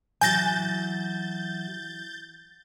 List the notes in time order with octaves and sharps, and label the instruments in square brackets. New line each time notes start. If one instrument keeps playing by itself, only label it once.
[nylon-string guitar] E3 F#3 [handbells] G#5 A#6 [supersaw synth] G6 A6